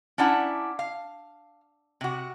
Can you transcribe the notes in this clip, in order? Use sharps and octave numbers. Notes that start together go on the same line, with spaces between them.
C#4 D4 E4 F#5 A#5
F5
C3 F#4